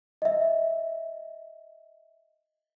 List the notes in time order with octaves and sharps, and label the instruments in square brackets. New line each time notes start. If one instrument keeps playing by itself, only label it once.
[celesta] D#5 E5